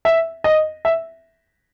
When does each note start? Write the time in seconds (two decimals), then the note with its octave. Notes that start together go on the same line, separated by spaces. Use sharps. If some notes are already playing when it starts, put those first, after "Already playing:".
0.05 E5
0.44 D#5
0.85 E5